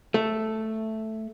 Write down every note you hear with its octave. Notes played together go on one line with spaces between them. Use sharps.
A3